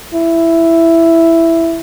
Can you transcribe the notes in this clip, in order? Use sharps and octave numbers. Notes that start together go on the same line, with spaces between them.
E4